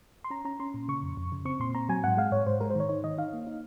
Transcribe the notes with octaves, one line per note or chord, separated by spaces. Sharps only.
C6
C#4 A#5
C#4 A#5
C#4 C6
A#2
C#3 C#6
F2
F2
C#3
C4 C#6
A#2 C6
C4 A#5
F#3 G#5
G#2 F#5
G#3 F5
G#2 C#5
G#2 C5
G#3 A#4
C5
D#3 C#5
D#4 C#5
D#3 D#5
D#4 F5
A#3
D#4